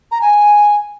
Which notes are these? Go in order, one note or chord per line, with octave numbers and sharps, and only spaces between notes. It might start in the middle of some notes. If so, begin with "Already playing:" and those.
A#5
G#5